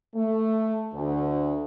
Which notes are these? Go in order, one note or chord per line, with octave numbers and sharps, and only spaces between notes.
A3
D2